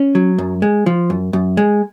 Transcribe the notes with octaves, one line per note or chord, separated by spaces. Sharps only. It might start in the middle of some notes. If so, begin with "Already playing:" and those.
Already playing: C#4
F#3
F#2
G#3
F3
F#2
F#2
G#3